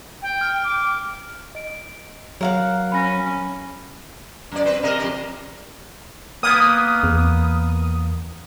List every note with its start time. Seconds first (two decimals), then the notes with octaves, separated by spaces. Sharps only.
0.22 G5
0.41 F6
0.64 D6
1.55 D#5 D7
2.41 F#3 A#4 F5 F#5
2.92 C#4 B5 A#6
4.51 F#2 D5
4.65 C4 B4 C5
4.83 C3 A#4 D#5
4.99 F2 G4
6.43 A#3 B3 D#6
7.03 E2